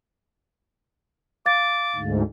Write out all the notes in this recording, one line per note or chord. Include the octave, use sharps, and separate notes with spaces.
F5 D6 A6
D2 G#2